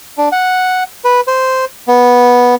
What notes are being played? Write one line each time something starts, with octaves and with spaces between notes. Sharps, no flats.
D4
F#5
B4
C5
B3